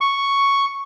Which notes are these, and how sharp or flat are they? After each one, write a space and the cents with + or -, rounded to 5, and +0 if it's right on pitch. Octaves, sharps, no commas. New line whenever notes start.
C#6 +0